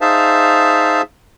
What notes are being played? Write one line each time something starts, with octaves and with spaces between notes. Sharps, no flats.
D#4 G#4 C5 E5 F5 A5